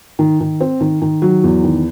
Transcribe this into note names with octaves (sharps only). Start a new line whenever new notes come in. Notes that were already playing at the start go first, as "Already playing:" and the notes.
D#3
D#3
C4
D#3
D#3
F#3
E2
D#3